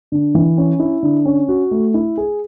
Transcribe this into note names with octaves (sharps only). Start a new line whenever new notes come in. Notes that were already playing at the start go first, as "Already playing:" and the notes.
D3
E3
C#4
E4
D3
C#4
F#4
A3
E4
G#4